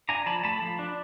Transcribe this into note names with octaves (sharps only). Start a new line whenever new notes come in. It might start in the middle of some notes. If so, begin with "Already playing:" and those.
D4 G#5 A#5
F3 A5 B5
A3 A5 B5
F3
D4